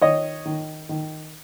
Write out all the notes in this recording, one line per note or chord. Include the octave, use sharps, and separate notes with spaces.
D#3 C#5 D#5
D#3
D#3